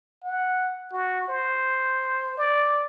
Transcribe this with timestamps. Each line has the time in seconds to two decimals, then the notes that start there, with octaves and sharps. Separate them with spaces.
0.24 F#5
0.93 F#4
1.29 C5
2.38 D5